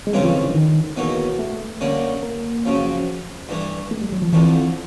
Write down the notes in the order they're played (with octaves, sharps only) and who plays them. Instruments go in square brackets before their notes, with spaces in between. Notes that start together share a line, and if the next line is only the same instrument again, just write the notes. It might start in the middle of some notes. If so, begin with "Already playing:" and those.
[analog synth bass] G#3
[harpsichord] C#3 E3 A3 C4 F4 [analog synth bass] G3
[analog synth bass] F3
D#3
D3
D#3
[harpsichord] E2 B2 F#3 A#3 D#4
[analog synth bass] A3
[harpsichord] D3 G3 A#3 C#4
[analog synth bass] A#3
[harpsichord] F#2 C#3 F3
G2 E3 A3
[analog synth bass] A3
G3
F#3
F3
[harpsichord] F2 D3 F3 A3 [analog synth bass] E3